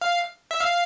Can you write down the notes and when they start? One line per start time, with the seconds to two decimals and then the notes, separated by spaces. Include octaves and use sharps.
0.01 F5
0.51 E5
0.60 F5